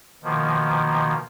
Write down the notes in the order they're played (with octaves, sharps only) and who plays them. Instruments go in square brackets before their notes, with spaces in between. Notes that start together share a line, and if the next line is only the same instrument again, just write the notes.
[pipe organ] B2 D#3 F3 A#3